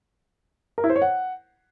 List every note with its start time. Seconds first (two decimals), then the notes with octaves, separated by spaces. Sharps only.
0.78 A#4
0.84 E4
0.90 C5
0.96 C#5
1.02 F#5